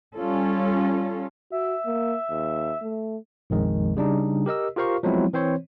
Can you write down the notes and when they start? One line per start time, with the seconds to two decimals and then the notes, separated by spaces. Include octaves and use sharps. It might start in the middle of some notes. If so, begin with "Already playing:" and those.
0.16 G3 C#4 F4 A4
1.52 F#4 E5
1.86 A#3
2.31 D#2
2.83 A3
3.50 A#1 F2 D#3 G#3
3.97 C#3 G3 D4 D#4
4.46 G4 A#4 D#5 E6
4.76 F4 G4 A#4 C5 F5 C#6
5.03 F3 F#3 G#3 B3 C4 E4
5.33 E3 C4 C5 C#5